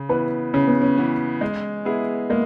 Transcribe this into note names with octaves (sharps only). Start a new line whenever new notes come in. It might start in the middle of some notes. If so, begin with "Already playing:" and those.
Already playing: C#3
E3 B3 B4
C#3 C#4
B3
C#4
E3 B3
G#3
B3 E4 G#4
G#3 A#3